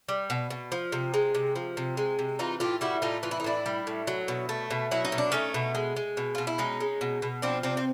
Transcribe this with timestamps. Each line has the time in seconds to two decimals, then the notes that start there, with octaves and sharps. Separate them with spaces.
0.09 G3
0.30 B2
0.50 B2
0.72 F3
0.92 C3
1.14 G#3
1.35 C3
1.56 F3
1.77 C3
1.97 G#3
2.19 C3
2.39 E3 D#4 F4
2.60 A2 F4 G4
2.81 G3 E4 F#4
3.02 A2 D#4 F4
3.23 E3 F4
3.31 E4
3.40 D#4
3.44 A2 D4 E4
3.66 G3
3.87 A2
4.07 F#3
4.28 B2
4.49 A3
4.71 B2
4.91 F#3 E4
5.05 D#4
5.12 B2
5.18 D4
5.32 A3 C#4 D#4
5.54 B2
5.75 G#3
5.96 G#3
6.17 B2
6.35 B2 F4
6.47 E4
6.58 G#3 C#4 D#4
6.80 G#3
7.01 B2
7.22 B2
7.42 F3 C4 D4
7.63 C3 C4 D4
7.77 C4